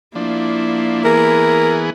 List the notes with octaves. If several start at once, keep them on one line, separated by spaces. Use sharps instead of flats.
F3 A#3 D4 E4
E3 B3 G#4 A#4